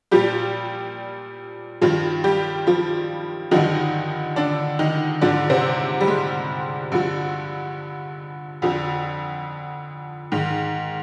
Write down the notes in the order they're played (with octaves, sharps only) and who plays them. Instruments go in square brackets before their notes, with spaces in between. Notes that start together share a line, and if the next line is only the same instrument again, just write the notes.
[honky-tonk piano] A#2 F3 G3 G4
G2 D#3 F3 F4
G3 G4
F3 F4
G2 D3 D#3 F3 D#4
D3 D4
D#3 D#4
G#2 D3 F3 D4
C3 C4
G3
G#3
G2 D3 F3
F2 D3 F3
G#2 D#3